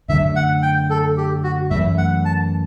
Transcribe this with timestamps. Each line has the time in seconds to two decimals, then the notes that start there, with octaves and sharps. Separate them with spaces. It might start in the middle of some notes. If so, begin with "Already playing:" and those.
0.08 F#2 D3 F#3 A3 E5
0.36 F#5
0.62 G5
0.90 A4
1.17 G4
1.43 F#4
1.71 F#2 E3 A3 E5
1.98 F#5
2.25 A5